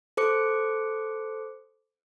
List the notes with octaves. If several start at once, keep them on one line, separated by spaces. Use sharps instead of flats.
A4 C5 D6 C#7